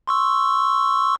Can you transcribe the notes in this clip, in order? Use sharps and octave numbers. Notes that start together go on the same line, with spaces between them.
C6 C#6 E6